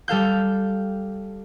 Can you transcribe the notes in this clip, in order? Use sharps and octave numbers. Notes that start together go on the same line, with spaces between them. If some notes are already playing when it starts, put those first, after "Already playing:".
G3 A4 F5 G6